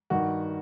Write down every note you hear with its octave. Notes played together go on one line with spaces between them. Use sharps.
G2 D#3 F#4